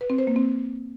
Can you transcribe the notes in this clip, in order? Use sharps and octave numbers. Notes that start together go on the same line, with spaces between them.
B4
C4
C5
A#3
C4